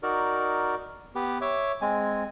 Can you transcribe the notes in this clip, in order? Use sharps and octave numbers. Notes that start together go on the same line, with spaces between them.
D#4 F#4 A#4 D5
B3 G4 B4
C#5 E5 D6
G#3 C4 G#5